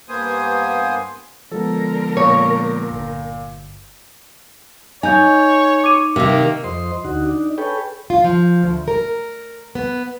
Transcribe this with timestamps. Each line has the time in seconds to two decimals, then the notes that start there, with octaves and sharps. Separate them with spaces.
0.09 G2 A#3 B3 C5 G#5 D#6
1.52 D3 F3 G#3 B3 A4 A#4
2.17 A#2 C#5
2.91 G1
5.03 D#4 C#5 G#5 G6
5.84 D6 D#7
6.16 C3 D#3 A#3
6.64 F2 C5 D#5 C6
7.04 D2 D#4 F#4
7.26 D4 D#4
7.58 G#4 A4 B4 C#5 G5
8.10 F4
8.24 F3
8.62 D2
8.88 A#4
9.75 B3